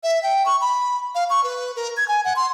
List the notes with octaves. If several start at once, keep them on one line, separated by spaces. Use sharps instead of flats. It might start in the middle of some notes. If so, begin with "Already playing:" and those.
E5
G5
C#6
B5
F5
C#6
B4
A#4
G#6
G#5
F#5
C6